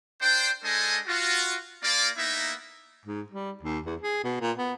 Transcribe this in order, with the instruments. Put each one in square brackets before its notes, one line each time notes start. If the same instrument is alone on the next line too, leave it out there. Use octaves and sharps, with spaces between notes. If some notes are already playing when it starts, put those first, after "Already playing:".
[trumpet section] D4 C5 G5
G#3 D4 A4 C5 D#5 G#5
F4 F#4
A#3 F4 D5
A#3 B3 D#4 E4 E5
[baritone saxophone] G#2
G3
D#2
E2
G#4
B2
A#2
B3